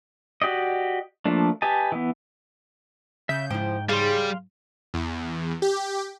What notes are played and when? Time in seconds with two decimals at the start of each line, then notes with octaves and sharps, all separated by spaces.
0.42 F#4 G4 D5 D#5
1.25 F3 A3 A#3 D4
1.62 G4 B4 D#5 G#5 A5
1.92 E3 B3
3.29 C#3 E5 G6
3.51 G#2 F3 E4 G5
3.89 C#3 G3 G#4 F5 C6
4.94 E2
5.62 G4